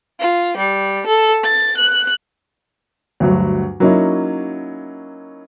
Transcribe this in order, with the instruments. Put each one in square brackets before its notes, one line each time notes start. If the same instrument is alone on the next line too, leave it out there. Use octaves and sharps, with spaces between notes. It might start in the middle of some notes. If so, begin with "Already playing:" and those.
[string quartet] F4
G3
A4
A6
F#6
[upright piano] D2 G2 F#3
F#3 A#3 C#4 D#4 E4